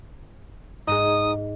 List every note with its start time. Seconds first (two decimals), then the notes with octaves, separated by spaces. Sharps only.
0.88 G#2 D#4 G#4 D#6